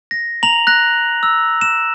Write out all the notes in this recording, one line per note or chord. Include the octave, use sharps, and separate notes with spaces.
A#6
A#5 F7 F#7
F#6 A#6
E6
E7